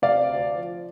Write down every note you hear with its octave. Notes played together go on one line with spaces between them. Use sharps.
C3 D5 F5
D2
F3